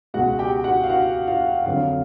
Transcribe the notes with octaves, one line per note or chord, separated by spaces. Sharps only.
C#2 B2 G#3 F#4 F#5
G4 G5
F#4 F#5
F5
F#4 F#5
F4 F5
F2 D3 F#3 F4 F5